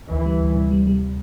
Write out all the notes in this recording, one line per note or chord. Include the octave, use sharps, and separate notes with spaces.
D2 E3
G3
D2
C3
G3
G3